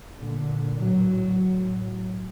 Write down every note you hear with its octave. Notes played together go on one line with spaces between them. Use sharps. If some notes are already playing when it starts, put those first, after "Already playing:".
A#2 D3
A2 F#3
A2